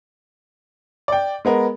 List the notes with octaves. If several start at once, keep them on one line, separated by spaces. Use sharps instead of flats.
D5 G5
G#3 B3 A#4